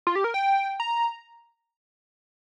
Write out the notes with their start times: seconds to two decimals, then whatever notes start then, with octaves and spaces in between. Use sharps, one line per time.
0.07 F4
0.16 G4
0.24 A#4
0.34 G5
0.80 A#5